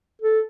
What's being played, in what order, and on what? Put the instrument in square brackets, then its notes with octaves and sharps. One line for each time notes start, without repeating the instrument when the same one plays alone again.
[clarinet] A4